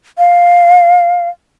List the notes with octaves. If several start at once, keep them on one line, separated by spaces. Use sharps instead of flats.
F5